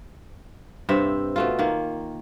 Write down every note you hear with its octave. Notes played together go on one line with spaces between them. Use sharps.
G2 C3 C4 E5
B2 A3 F4
D#3 A#3